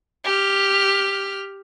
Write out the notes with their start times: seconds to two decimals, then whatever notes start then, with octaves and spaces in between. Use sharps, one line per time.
0.25 G4 F6